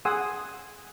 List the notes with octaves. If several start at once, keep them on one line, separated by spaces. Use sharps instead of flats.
G#4 F#5 G#5 C6 D#6 E6